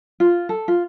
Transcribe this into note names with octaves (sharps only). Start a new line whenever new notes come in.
F4
A4
F4